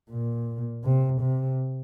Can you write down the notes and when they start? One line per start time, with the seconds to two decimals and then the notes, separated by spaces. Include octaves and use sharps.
0.10 A#2
0.84 C3
1.22 C3